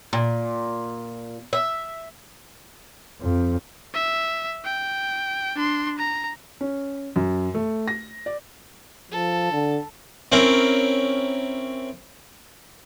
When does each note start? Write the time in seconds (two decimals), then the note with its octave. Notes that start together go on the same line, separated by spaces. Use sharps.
0.13 A#2
1.53 E5
3.21 F2
3.94 E5
4.65 G5
5.55 D4 C6
5.98 A#5
6.61 C#4
7.16 F#2
7.54 A3
7.88 A#6
8.26 D5
9.12 F3 A4
9.52 D3
10.32 C4 C#4 E4 A#4